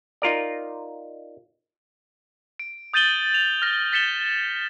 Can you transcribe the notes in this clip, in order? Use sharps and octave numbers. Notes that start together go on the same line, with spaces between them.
D#4 F4 A#4 D5
D7
D#6 G6 A6 D#7 F#7 G7
F7 F#7
F6 A#6 F7
A6 B6 C#7 E7 G7